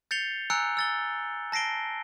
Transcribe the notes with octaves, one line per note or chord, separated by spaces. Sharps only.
G6 A6 C7 C#7 F7 G7
G#5 A#5 E6 F#6 C#7 D7
E6 A6 G7
A5 A#6 C7 D7 G7